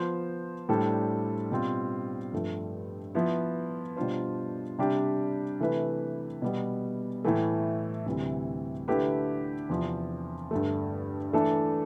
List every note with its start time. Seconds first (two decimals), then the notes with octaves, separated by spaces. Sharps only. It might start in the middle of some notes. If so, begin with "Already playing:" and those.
Already playing: F3 B3 F4 C5
0.69 A2 G3 D4 A4 C5
1.51 B2 G3 C4 F4
2.33 G2 F3 A3
3.15 F3 B3 E4
3.97 B2 G3 D4 F4 C5
4.78 C3 G3 D4 G4
5.60 C3 E3 A3 E4 B4
6.42 B2 G3 B3
7.25 A2 E3 A3
8.06 D2 C3 E3 G3 C4
8.88 D3 A3 E4 G4 B4
9.69 E2 C3 F3 C4
10.51 G2 D3 A3
11.33 E3 A3 D4 A4